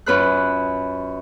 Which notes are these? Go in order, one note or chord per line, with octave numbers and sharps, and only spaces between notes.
F#2 F4 B4 B5 F6 F#6